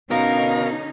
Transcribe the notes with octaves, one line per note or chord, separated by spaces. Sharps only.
B2 D3 C#4 D#4 A#4 F5